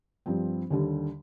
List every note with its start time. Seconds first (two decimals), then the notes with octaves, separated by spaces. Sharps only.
0.26 G2 F3 C4
0.70 D#2 D3 G3